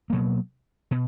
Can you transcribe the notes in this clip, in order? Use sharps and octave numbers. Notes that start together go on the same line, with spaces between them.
B2 F#3 A#3
B2